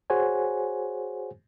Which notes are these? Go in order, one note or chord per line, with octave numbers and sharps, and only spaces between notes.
F#4 G#4 C5 C#5 F#5 G#5